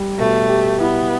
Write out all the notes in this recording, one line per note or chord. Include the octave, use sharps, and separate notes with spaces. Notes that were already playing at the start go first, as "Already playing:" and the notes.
Already playing: G3
B2 A3
G4
B3 E4